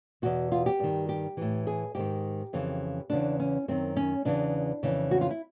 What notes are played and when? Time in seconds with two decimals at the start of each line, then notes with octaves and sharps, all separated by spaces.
0.22 E2 B2 F#4
0.52 F4
0.66 G4
0.80 G2 D#3
1.09 G4
1.37 A2 E3
1.67 G#4
1.95 G#2 D#3 G4
2.53 F2 C#3 E3
3.10 E2 C#3 E3 D4
3.40 C#4
3.68 F#2 D#3 C4
3.97 C#4
4.25 E2 C#3 E3 D4
4.83 F2 C#3 E3
5.11 F#4
5.21 F4
5.30 E4